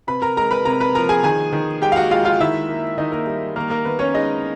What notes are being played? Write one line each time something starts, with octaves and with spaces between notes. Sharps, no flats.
C3 B4 B5
A#4 A#5
G#3 A#4 A#5
B4 B5
C3 A#4 A#5
B4 B5
F3 A#4 A#5
G#4 G#5
D#3 G#4 G#5
D#3
G#3 G4 G5
F5
F#4 F#5
G#3 F4 F5
F4 F5
D#3 E4 E5
A#3
D#3 D#4 D#5
A#3 A#4
G3
D#3 A#3 A#4
A#3 A#4
D#3 B3 B4
C#4 C#5
G#3 D#4 D#5